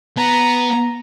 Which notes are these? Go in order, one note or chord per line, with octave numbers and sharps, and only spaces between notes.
B3 A#5